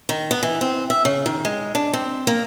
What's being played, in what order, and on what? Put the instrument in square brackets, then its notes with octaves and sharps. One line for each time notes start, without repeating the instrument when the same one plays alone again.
[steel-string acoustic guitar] D#3
B3
E3
C4
E5
C#3
D#3
G#3
D4
C4
A#3